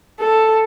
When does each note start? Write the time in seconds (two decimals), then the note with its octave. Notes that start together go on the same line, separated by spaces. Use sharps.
0.19 A4